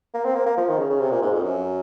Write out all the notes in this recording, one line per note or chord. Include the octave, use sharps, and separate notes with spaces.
A#3
C4
A#3
A#3
F3
D#3
C#3
C#3
C3
A#2
G#2
F2
F#2